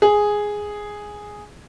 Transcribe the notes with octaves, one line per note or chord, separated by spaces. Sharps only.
G#4